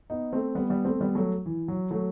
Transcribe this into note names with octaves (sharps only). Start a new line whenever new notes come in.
B3 D#4
A3 C4
G3 B3
G3 B3
A3 C4
G3 B3
F#3 A3
E3
F#3
F#3 A3